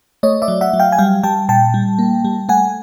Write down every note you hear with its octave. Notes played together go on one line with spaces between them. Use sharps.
A3 C#5 D#5
D5 E5
F#3
E5 F#5
F#3
F5 G5
G#5
G3 F5 G5
G3 G5 A5
A#2 G5 A5
G3
A#3
G3
A3 F#5 G#5